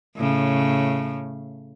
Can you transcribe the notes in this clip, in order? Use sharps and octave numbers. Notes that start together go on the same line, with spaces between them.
A2 C#3